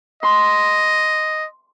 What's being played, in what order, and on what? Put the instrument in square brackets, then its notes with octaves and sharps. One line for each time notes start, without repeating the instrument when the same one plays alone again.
[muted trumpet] D#5 [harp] C6